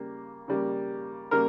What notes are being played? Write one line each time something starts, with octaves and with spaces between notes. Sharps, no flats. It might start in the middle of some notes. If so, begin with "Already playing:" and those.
Already playing: C#3 G3 A#3
C#3 G3 A#3
C#3 G3 A#3 A#4